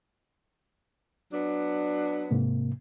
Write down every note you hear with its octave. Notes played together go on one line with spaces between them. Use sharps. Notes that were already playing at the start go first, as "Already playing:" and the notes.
F#3 B3 D4
G#2 C3 A#3